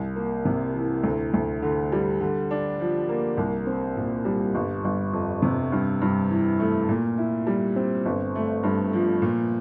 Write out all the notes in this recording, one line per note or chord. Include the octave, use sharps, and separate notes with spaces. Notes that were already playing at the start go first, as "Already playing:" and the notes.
Already playing: C2
A#3
C3
E3
D2
D2
D3
G3
D3
D4
F3
A#3
C2
C4
A#2
G3
G1
G1
F2
C3
G2
G2
E3
A3
A#2
E4
G3
C4
G1
A3
G2
F3
A#2